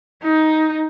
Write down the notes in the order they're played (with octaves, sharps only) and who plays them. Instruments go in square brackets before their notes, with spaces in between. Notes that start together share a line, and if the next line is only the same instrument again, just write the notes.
[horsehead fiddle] D#4